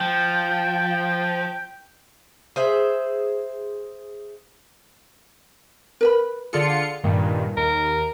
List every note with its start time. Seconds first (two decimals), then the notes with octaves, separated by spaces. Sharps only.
0.01 F3 G5
2.56 G#4 C5 E5
6.01 A#4 B4 B5
6.53 D3 F4 G#4 A4 D5 C#7
7.04 G2 A#2 D#3
7.57 D#2 A#4